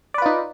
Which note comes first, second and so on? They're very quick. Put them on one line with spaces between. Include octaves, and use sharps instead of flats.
D5 B4 F4 D#4